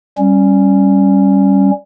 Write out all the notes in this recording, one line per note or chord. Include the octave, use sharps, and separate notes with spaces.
G3 C#4